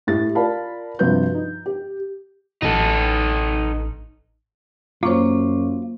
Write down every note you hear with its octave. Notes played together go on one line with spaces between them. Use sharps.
A2 G4 A6
F4 A#4 D5 F5 A5 B5
G2 C3 F3 F#4 B4 G6
D#4
G4
A1 D#4 A4
F#2 A#3 F4 C5 C#5 C#6 D6